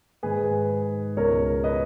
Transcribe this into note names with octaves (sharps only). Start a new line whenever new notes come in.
G#2 D#3 G#4 B4
C#2 B2 A#4 C#5
B4 D#5